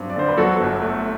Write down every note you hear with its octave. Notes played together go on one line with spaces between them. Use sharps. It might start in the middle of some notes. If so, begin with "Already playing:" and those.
Already playing: G2 F#3 C4
D5
D3 C5
B4
F#3 F#4 A4
G1
A3